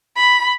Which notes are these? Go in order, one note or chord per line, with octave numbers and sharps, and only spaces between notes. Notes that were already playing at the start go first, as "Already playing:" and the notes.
B5